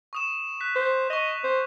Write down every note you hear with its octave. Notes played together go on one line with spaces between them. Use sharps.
C#6 D#6 E7
F#6 B6
C5
D#5 C#6 F7
C5